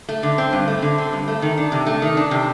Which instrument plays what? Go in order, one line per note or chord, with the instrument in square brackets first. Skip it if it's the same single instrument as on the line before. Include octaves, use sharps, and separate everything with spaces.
[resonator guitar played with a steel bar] A3
D3
C4
G2
A3
D3
C4
G2
A3
D#3
D4
C3
A3
D#3
D4
C3